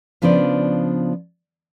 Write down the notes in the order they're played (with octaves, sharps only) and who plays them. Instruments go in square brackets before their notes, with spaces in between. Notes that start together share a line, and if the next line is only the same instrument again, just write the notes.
[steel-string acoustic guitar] C#3 F3 B3 D4 C5 D5